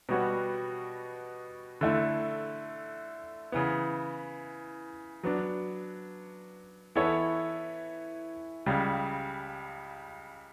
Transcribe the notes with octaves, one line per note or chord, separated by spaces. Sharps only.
B2 G3 B3 F#4 C#5
D3 A3 E4
C#3 E3 B3
F#3 B3 D4
E3 B3 E4 A4 C#5
C#2 C#3 G3